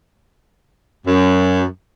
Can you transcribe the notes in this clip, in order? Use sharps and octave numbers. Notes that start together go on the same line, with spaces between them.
F#2